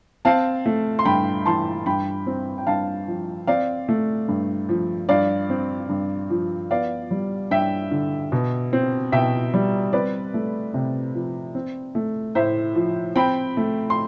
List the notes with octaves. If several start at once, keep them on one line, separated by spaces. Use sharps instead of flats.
C4 F5 A5
A3
C6
G2 G5 B5
E3 A5 C6
G2 G5 B5
C4
G5
G2 F5 A5
F3
C4 D5 F5
A3
G2
F3
G2 D5 F5
C4
G2
F3
B3 D5 F5
G3
G2 E5 G5
D3
B2
C4
B2 E5 G5
G3
C4 B4 D5
A3
C3
F3
C4
A3
A2 C5 E5
F3
C4 G5 B5
A3
C6